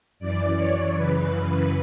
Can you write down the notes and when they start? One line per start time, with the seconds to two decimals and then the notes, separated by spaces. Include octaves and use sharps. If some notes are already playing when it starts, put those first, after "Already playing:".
0.19 F#2 E3 D5
0.57 C#5
0.93 F#2 C#3 E3 B4